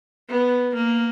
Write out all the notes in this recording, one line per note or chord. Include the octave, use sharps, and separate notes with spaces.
B3
A#3